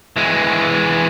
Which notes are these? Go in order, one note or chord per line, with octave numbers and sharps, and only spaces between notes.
E3 G#3